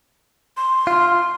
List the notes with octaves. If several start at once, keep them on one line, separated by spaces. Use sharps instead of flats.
C6
F4